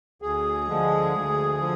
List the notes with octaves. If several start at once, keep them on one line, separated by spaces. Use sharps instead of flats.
D2 G#4
D3 F3 G#3
D2
D3 F3